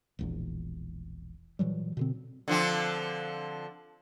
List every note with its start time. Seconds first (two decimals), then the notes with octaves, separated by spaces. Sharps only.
0.19 E1 A#1 E2
1.59 A#2 E3 F#3 G3
1.97 B2 D3 C4
2.48 D3 F3 C4